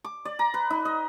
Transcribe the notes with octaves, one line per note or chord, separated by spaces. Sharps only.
D6
D5
A#5
B4
D#4
D#5